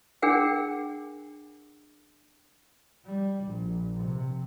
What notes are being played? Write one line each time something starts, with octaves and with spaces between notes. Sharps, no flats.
D4 G#4 A#4 F#5 G5
G3
A#1
C3